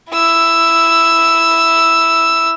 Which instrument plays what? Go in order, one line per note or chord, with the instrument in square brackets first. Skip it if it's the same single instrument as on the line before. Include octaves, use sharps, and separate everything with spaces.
[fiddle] E4 E6